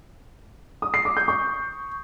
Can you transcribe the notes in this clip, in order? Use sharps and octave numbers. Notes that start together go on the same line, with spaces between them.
D#6
C7
D6
G6
C#6